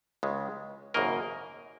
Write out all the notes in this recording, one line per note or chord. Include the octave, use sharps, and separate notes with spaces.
C#2 C#3 G#3
G#1 F#2 C#3 A#3 A#4 D#5